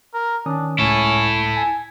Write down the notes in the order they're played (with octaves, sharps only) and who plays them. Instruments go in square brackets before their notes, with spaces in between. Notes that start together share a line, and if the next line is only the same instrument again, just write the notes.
[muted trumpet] A#4
[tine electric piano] D#3 C#4 D#6 [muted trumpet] D4
[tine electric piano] C#2 A2 [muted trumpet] C#4 [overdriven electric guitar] E4 A4
[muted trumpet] G#5